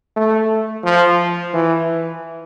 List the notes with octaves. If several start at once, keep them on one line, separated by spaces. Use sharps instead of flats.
A3
F3
E3